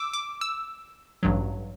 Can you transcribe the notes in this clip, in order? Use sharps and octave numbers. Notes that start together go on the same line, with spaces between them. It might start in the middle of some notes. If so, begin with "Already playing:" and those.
Already playing: D6 E6
D6
E6
A1 G2 F#3